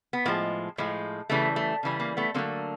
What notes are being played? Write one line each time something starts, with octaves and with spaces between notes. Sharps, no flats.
B3
A2 F3 G#3 A#3
A2 F3 G#3
C#3 E3 G3 A3
A3
C#3 E3 G3
A#3
A3 B3
D3 F#3 A3 A#3 C4